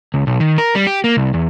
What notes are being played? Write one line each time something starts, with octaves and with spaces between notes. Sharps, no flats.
C#2
B1
D#3
A#4
G3
G4
A#3
C2
E2